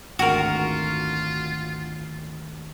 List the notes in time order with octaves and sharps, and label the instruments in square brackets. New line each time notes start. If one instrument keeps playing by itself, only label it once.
[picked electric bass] G#1 D2 [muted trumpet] F4 [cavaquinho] F#4 A#4